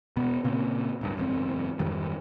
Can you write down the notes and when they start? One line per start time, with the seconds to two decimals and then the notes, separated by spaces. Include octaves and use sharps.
0.16 E1 B2 B3
0.44 A#2 C#3 A#3 C4
1.01 D1 G2
1.17 F#1 E2 G#2 C4
1.79 F2 G#2 D#3 G3